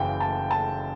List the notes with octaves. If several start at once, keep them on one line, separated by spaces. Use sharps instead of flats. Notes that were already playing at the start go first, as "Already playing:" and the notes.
Already playing: F#1 F#2 C#3 E3 G5
A5
A5